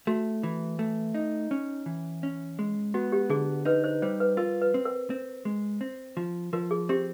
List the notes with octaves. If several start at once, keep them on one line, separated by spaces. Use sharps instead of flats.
A3 F#4
E3
A3
D#4
C#4
E3
C#4
G#3
B3 F#4
G4
D3 G#4
D#4 B4
C5
G3 C5
B4
F4 A#4
B4
C4
A#4
C4
G#3
C4
F3
F3 A#4
G#4
C4 G4